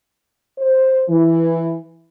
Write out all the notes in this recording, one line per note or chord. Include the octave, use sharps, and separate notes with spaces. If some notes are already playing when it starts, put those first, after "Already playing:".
C5
E3